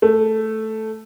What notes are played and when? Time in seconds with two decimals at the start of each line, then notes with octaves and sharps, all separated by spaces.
0.02 A3